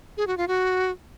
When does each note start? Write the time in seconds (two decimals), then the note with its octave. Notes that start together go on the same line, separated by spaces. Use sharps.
0.17 G#4
0.27 F#4
0.37 F4
0.48 F#4